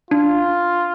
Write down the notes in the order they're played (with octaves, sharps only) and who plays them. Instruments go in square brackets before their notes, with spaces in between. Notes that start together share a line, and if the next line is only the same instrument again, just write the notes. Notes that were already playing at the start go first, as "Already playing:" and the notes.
[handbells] D4 [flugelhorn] F4